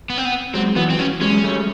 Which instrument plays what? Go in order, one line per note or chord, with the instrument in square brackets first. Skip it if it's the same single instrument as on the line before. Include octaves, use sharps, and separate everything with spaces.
[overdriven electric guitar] B3
C4
B3
[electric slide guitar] F#3 G#3 [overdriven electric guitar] C4
[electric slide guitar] E3 F#3 [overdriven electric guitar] B3
[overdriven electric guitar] C4
C#4
[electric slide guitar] F#3 G#3 [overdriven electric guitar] C#4
[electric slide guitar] G3 A3